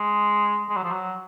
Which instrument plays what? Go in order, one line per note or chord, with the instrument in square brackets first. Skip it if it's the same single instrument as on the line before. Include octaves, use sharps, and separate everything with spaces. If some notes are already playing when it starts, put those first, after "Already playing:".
Already playing: [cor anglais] G#3
G#3
F#3
F3
F#3